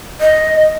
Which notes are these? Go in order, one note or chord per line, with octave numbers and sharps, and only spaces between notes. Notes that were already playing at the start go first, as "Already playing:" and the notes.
D#5